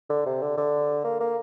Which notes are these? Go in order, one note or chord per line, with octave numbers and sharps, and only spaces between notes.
D3
C3
D3
D3
A#3
A#3